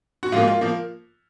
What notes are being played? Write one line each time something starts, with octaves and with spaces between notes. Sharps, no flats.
F#4
G#2 F3 A#3 F4
F4
F3 A#3